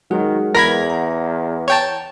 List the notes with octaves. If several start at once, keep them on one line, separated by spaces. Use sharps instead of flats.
D#3 F#3 G#3 G#4 F#5
E2 A#4 B5 G#6 A#6
F#5 A#5
C#5 G5 A5